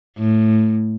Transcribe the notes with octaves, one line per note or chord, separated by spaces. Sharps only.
A2